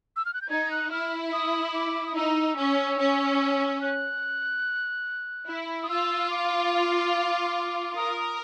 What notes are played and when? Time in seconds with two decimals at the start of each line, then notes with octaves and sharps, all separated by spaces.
0.16 E6
0.25 F6
0.34 F#6
0.42 G6
0.50 D#4 G#6
0.71 F#6
0.91 E4 F6
1.33 D#6
1.68 D#6
1.74 D6
2.06 D#6
2.15 D#4 E6
2.57 C#4
2.99 C#4
3.81 F#6
5.47 E4
5.83 D#6
5.89 F4 E6
6.30 D6
7.96 A#4 D#6
8.17 D#6